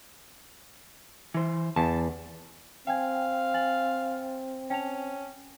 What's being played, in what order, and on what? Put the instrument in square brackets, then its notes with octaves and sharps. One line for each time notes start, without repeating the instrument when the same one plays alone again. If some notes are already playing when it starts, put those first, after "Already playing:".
[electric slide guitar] E3 C5
[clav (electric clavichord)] E2 [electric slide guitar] A5
[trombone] C4 [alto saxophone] F5 [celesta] G5 G#5 G#6
[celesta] G#5 A6 F#7
[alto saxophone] C#4 [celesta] G5 A5 F7